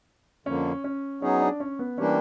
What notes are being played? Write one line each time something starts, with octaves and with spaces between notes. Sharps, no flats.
F2 D3 F3 A#3 C#4
C#4
F#3 B3 C#4 D#4 G#4
D4
C#4
B3
E3 G3 A#3 C#4 D4 G4